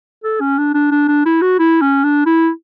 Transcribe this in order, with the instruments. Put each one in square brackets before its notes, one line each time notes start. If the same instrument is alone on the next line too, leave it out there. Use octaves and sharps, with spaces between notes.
[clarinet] A4
C#4
D4
D4
D4
D4
E4
F#4
E4
C#4
D4
E4